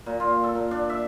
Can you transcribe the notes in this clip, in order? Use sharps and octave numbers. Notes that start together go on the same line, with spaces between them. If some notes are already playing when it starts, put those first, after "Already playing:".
A#2
F4
A4
A#2
D4
E5